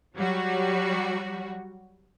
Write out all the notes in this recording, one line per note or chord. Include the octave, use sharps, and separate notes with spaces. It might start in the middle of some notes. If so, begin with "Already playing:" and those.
F#3 G3 F#4